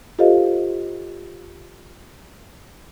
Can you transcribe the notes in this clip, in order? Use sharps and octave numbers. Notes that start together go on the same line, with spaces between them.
F4 G4 A4 C5 D#5 F5